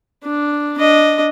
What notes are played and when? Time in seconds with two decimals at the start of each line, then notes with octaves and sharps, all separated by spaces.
0.23 D4
0.78 D4 D#5